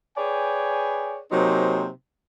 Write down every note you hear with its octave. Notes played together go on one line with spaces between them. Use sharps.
G#4 B4 C#5 D5 G5 G#5
C3 F#3 A#3 D#4 G#4 C5